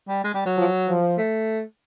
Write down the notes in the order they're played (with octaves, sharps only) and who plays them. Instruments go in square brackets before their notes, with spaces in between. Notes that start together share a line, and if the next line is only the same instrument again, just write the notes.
[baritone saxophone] G3
G#3
G3
F#3
[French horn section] F3
F3
[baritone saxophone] A3